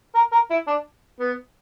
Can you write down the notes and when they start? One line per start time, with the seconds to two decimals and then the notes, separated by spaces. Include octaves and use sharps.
0.15 A#4
0.32 A#4
0.50 E4
0.67 D4
1.20 B3